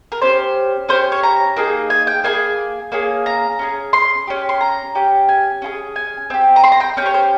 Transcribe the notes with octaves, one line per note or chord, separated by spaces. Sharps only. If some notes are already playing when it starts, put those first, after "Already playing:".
A#4
C#4 G4 C5
C#4 G4 C5
C#5
A#5
A#3 D#4 G#4
G#5
G5
A#3 D#4 G#4 G#5
A#3 C#4 G#4
A#5
C#4 F4 G#4
C6
C#4 G4
C6
A#5
C#4 G4
G#5
C#4 F4 G#4
G#5
C4 G4
A#5
C6
A#5
G5
C#4 G4 C#5 G5
C5